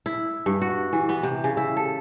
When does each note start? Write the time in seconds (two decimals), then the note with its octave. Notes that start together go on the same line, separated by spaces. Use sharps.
0.06 E4
0.46 G2
0.62 F#4
0.93 E3
1.09 B3
1.23 C3
1.44 C#3
1.57 E4
1.77 A4